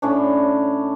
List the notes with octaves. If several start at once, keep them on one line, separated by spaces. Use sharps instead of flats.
A2 C#4 D4